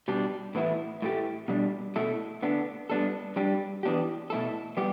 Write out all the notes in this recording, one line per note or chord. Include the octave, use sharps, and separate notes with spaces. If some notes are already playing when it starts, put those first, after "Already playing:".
B2 G3 D4
A2 E3 B3 E4
A2 A3 G4
B2 G3 D4
B2 A3 E4 A4
D3 B3 D4
G3 B3 D4 A4
G3 D4 G4
E3 B3 D4 G4
B2 A3 E4 A4
G3 B3 G4